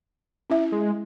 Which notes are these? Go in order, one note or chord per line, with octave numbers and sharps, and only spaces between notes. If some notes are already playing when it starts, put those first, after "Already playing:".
C#4 E4 E5
G#3